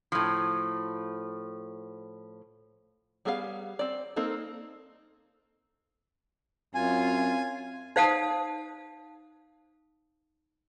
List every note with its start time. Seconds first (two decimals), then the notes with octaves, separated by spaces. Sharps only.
0.12 A2 F3
3.25 G3 B3 G#4 C5 F5
3.79 C4 D5
4.16 A#3 C4 D#4 A4
6.75 F#2 C4 F4 G#5
7.96 D#4 C5 F5 F#5 A5 D#6